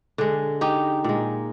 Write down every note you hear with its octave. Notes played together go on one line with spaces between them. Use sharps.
D3 G#3
D#4 G4
A#2 G#3